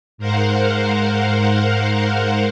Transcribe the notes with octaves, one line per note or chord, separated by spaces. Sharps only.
G#2 A#4 C5 F5 F#5